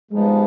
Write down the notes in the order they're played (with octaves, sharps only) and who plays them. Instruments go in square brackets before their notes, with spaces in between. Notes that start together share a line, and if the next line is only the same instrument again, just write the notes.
[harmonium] G2 F3 B3 D#4 [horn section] G#3